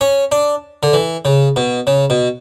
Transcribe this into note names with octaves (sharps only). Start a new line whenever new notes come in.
C#4
D4
D3
E3
C#3
B2
C#3
B2